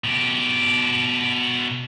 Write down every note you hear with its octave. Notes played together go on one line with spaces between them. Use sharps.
B2 G4